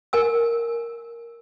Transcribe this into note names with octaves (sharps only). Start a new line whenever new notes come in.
A#4 G#5 E6